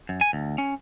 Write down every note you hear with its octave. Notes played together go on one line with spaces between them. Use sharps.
F#2
G#5
D2
C#4